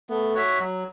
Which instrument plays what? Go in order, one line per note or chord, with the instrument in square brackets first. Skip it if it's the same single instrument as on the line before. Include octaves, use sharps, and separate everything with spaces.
[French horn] A3 [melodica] B3
[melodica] F#4 C#5 E5
F#3